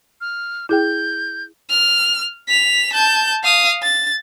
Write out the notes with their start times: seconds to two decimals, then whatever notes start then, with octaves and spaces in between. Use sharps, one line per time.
0.21 F6
0.69 E4 G#4 G5 G6
1.70 F6
2.48 B6 F7
2.93 A5 G6
3.44 F5 D#6
3.82 A6